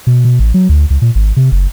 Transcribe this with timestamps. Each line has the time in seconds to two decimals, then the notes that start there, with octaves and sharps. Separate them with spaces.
0.07 B2
0.25 B2
0.39 A1
0.54 F#3
0.69 D2
0.90 C#2
1.02 A#2
1.15 G#1
1.36 C3
1.52 F#1